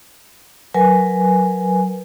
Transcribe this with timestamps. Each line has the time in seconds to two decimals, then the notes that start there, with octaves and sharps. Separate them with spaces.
0.74 F#3 A#4 B4 G#5